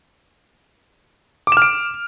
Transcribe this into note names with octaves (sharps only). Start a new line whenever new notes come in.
D6 F6 D7 E7